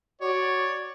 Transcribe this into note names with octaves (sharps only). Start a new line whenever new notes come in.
F#4 C#5 D5